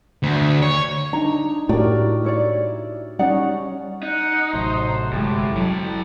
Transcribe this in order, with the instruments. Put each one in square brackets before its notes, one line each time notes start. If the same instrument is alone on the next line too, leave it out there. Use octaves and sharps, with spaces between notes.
[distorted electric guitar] D2
C#5
[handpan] D4 D#4 [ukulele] A#5
[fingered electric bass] A2 [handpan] F#4 G4 A#4 [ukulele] D5
[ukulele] E4 C#5 D5
[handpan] G3 C#4 C#5 [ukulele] D#4 D5 F#5
[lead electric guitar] D#4 [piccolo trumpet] F#5
[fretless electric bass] A1 [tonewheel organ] C3 F#3 A3 [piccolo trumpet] C5
[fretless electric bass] G1 G#3 [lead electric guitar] A2 [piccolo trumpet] G4
[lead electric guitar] E3 A4 [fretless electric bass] F#3